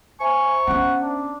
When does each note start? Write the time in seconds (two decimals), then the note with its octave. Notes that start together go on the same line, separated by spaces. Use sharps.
0.20 C5 E5 G#5 A#5 C#6
0.67 B3 C#4 F#5
1.00 D4